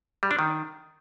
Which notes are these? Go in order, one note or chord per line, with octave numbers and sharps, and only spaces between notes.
G3
D4
D#3